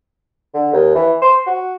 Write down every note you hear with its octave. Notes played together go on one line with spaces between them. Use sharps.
D3
D#2
E3
C5
F#4